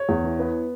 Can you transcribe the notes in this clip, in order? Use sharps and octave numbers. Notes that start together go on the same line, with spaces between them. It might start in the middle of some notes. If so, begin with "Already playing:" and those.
Already playing: C#5
E2
E3
B3